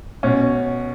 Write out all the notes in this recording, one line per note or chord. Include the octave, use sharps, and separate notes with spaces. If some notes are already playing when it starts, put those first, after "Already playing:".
B2 C#4